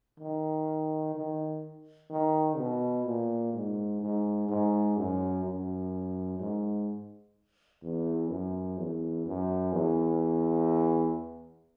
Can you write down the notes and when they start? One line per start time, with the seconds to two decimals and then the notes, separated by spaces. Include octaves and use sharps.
0.19 D#3
1.15 D#3
2.10 D#3
2.57 B2
3.06 A#2
3.53 G#2
4.00 G#2
4.48 G#2
4.97 F#2
5.44 F#2
6.39 G#2
7.82 E2
8.30 F#2
8.78 E2
9.26 F#2
9.73 E2